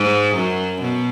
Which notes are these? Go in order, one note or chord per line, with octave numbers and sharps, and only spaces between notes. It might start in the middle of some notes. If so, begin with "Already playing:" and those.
Already playing: G#2 G#3
F#2 F#3
B2